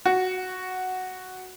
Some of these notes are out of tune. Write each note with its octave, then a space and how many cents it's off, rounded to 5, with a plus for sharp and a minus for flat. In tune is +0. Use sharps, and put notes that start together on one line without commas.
F#4 +0